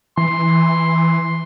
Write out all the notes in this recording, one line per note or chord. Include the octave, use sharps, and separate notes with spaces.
E3 C6